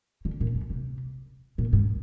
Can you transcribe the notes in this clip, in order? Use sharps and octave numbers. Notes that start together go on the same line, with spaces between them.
D3
A#2
F2
C3
A#2
G#2